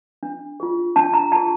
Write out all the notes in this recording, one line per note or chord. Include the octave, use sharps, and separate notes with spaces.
D4
F4 G#4
D4 A5
A#5
F4 G#4 A5